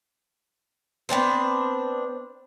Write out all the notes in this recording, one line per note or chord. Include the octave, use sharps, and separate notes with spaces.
B3 C4 D4 C5